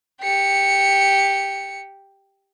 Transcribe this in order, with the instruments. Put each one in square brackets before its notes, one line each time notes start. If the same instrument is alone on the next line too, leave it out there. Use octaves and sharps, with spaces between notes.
[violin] G4 C#7